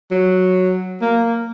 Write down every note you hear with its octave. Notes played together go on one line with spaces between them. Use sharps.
F#3
A#3